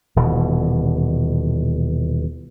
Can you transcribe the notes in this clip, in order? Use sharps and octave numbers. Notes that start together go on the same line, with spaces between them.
D#1 B2 E3